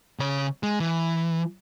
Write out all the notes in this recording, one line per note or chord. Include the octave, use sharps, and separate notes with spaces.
C#3 C#5
G#3
E3